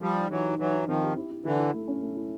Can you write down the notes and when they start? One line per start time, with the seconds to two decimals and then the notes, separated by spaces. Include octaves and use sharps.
0.01 F3 G3 G4
0.16 D#4
0.30 E3 F#3 D#4
0.45 D#4
0.59 E3 F#3 D#4
0.73 D#4
0.87 D#3 F3 C4
1.02 G4
1.16 E4
1.31 E4
1.45 D3 E3 E4
1.59 E4
1.74 A3
1.88 C#4
2.02 A3
2.17 E4